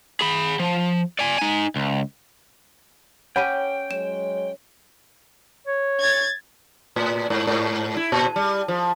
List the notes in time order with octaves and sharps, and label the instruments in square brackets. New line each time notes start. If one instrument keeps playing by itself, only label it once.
[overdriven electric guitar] G#4 B5
F3
D5 G#5
D#4 G#5
C#2
[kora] C#4 G4 [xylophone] F#5 B5 D#7 [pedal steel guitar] G5
[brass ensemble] F#3 G#3 C#5 [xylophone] E7
[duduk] C#5
[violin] G#6 A6
[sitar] A2
G#2
G#2
E4
A#2
G3
F3